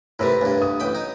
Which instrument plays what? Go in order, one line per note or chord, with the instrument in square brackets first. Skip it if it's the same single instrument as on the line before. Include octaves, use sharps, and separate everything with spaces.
[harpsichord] A2 C3 G3 [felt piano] A#4 B4
[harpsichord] D2 G2
[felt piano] D#6
[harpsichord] A1 G5 B5
D#4